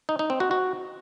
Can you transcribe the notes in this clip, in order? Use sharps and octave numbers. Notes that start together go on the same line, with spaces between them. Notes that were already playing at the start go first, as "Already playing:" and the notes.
D#4
D#4
C4
F#4
F#4